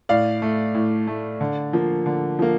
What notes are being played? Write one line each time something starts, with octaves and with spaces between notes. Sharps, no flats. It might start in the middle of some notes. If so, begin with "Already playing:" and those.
A2 D5 F5
A3
A2
A3
D3
F3 A#3
D3
F3 A#3